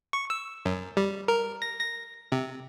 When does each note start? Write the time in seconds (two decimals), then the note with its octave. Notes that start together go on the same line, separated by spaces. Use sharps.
0.13 C#6
0.30 E6
0.65 F#2
0.97 G3
1.28 A#4
1.62 A#6
1.80 A#6
2.32 C3